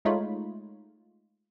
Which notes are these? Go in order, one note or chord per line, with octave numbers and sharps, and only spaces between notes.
G#3 A3 D#4 F4 C#5 B5